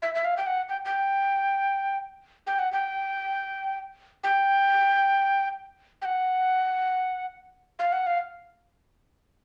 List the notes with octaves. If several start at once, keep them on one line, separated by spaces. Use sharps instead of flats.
E5
E5
F5
G5
F#5
G5
G5
G5
F#5
G5
G5
G5
F#5
F5
F#5
F5